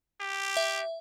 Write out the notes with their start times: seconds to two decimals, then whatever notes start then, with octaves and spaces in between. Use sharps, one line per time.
0.21 G4
0.57 E5